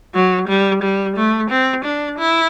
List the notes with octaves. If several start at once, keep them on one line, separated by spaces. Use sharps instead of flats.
F#3
G3
G3
A3
C4
D4
E4